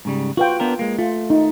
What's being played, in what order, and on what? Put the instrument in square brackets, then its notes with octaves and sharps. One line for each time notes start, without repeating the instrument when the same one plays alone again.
[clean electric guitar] G#2 C#3 G3
[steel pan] F4 B4 G5 [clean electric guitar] F#4
[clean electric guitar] B3 D4 A#4
G#3 A#3
[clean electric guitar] A3 [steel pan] F4
[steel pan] D#4